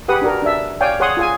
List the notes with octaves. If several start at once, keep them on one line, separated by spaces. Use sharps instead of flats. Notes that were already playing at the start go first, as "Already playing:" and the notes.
G4 G#4 B4 F#5 D#6
D4 F#4 A#4
D4 E5
C#5 D5 F5 G5 G#5
G#4 C#5 F#5 C6 D#6
F4 G#4 G#5